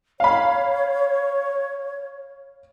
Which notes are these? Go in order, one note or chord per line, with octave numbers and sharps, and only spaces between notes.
C#5 F5 B5